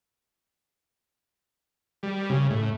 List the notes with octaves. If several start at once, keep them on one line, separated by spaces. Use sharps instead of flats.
G3
C#3
A2